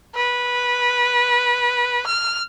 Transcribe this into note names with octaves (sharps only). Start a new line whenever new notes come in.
B4
F6